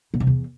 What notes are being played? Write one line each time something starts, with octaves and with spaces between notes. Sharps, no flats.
B2
C3
E2